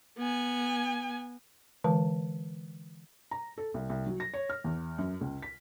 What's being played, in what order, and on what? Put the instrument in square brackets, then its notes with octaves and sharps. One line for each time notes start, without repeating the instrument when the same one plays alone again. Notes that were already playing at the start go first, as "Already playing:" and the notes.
[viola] B3 G#5
[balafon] D3 E3 G#3 B4 A5
[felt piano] A#5
A4
C2
C2
F#3
A#6
C#5
F6
E2
F#2
C#2
B6